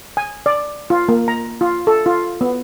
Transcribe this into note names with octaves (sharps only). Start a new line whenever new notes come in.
G#5
D5
F4
A#3
A#5
F4
A4
F4
B3